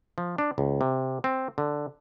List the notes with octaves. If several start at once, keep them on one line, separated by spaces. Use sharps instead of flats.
F3
D4
C#2
C3
C4
D3